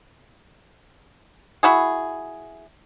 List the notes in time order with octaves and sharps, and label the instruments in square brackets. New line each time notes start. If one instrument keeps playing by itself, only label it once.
[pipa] E4 F#4 G#4